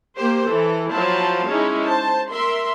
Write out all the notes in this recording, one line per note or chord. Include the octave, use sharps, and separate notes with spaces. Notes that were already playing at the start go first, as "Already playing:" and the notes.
A#3 G4 C5
E3 A4
F3 F#3 E4 C5 F5 A5
G#3 C#4 D#4 E4
C5 A5
A#4 E5 C6